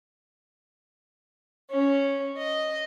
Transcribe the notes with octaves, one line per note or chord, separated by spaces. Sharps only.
C#4
D#5